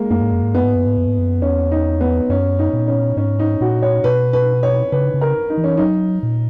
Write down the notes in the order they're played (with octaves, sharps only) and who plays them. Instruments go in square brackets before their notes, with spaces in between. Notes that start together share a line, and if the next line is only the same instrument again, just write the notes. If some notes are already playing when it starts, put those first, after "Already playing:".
Already playing: [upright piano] G#3 A#3
[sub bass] F#2 [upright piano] A#3
[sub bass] G#2
F#2
G#2
[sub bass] F#2 [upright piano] B3
[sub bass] G#2
F#2
G#2
F#2
G#2
F#2
[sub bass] E2 [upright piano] C#4
[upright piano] D#4
B3
[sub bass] F#2 [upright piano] C#4
[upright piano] D#4
[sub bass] A#2
[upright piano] C#4
[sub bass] G#2 [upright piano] C#4
[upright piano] D#4
[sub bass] A#2 [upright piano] F#4
[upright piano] C#5
[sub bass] B2 [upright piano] B4
[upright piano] B4
C#5
[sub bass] C#3 [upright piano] B4
[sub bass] C#3
[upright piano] A#4
D#4
[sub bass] E3
[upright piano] C#4
[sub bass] F#3 [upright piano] D#4
[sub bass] A#2